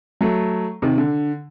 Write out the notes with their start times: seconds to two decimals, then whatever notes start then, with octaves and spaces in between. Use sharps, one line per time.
0.21 F#3 A3
0.82 C3 D#3
0.98 D3